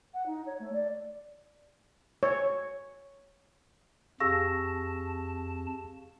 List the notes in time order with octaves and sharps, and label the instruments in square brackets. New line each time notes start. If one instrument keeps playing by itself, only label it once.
[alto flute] F#5
D#4
C#5
A3
D5
[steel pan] C#5
[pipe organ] F2 A5 [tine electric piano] G4 G#4 F5 [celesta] C#6 E6 A#6